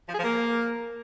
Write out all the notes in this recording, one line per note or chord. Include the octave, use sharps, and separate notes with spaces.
F3
G#4
F3
A#3